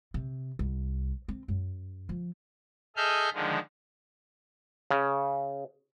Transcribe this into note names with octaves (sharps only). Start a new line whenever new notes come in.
C3
C2
C4
F#2
F3
G#4 A4 D#5 E5 F6 G6
D3 D#3 F3 G#3
C#3